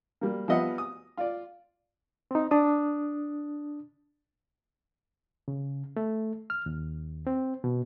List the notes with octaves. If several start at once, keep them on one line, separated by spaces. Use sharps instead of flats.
G3 A#3
F3 G3 B3 D#5 E5 F#5
D#6
F4 D5
C4 D#4
D4 D#6
C#3
A3
F6
D#2
C4
B2